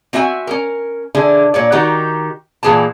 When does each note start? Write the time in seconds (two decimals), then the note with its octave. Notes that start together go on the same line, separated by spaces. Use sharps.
0.13 C4 F#4 E5 G5 G#5
0.47 C#4 A#4
1.15 D3 D4 E4 G#4
1.54 A#2 C#5 D5
1.72 D#3 D#4 F#4 G4
2.63 A#2 E3 G#4 G5 A5